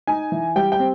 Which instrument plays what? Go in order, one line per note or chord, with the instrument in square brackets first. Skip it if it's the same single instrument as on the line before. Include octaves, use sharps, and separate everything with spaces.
[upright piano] D#4 G#5
E3
G3 G5
G5
C4